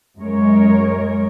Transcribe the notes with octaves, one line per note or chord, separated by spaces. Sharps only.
F#2 G#3 A#4 C#5